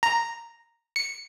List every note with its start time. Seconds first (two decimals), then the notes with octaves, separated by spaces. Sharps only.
0.03 A#5
0.96 C#7